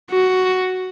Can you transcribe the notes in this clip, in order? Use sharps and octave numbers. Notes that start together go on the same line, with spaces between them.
F#4